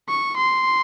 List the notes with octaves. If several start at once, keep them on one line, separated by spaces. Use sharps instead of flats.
C#6
C6